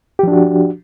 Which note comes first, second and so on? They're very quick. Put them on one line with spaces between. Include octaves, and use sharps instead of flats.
G4 F3 D4 F#4